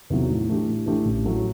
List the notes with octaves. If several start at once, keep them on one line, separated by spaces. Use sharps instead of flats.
E2 C3 D#3 F#3
A2
E3 A3 D4 G4
A2
E3 A3 D4 G4
A1
A2 F#3 A3